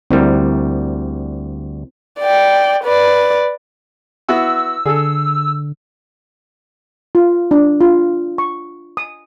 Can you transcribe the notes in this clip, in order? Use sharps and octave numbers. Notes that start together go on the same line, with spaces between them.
D2 G3 C4 E4 A#4
D5 G5
B4 D5
B3 E4 F#4 E6
D3 G#4 A4
F4
D4
F4
C#6
D#6